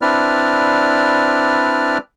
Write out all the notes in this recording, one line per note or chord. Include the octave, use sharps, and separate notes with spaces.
C4 D4 E4 B4 D5 F6